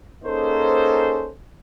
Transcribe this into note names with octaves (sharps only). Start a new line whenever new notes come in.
A#3 C#4 D#4 G#4 A4 C5